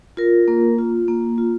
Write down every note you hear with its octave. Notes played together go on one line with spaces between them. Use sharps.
F4 A#4
A#3
F4
A#3
F4